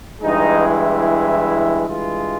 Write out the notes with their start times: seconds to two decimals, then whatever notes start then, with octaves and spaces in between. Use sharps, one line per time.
0.21 G2 E3 G#3 D#4
0.64 E4
1.88 G2 E3 G#3 F4